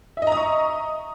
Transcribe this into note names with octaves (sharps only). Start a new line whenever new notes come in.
D#5 E5 A#5 C#6 D#6